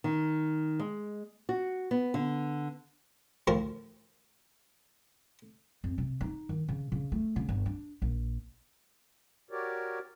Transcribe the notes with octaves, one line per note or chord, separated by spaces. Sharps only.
D#3
G#3
F#4
B3
D3
D2 A2 F3 A#4
F2
C3
D#4
D#3
C#3
C#3
A3
C#3
G1
D4
A#1
F#4 G4 A#4 C#5 D5